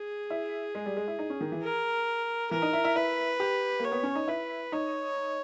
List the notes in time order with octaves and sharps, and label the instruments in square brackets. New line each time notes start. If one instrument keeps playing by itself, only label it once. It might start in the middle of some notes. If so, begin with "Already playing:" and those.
Already playing: [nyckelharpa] G#4
[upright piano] E4
G#3
G3
G#3
E4
D#4
C#4
D#3
E3
[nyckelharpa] A#4
[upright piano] E3 [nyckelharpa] A#4
[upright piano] D#4
E4
E4
[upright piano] E4 [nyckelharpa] B4
[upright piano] G4
[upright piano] A#3 [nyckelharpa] C#5
[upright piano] B3
C#4
D#4
[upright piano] E4 [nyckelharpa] B4
[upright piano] D#4 [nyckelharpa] C#5